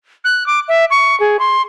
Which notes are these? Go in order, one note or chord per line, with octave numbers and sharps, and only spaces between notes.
F#6
D6
E5
C#6
G#4
C6